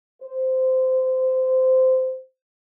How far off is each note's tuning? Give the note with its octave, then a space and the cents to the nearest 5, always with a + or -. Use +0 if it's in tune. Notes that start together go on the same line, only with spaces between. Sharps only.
C5 -15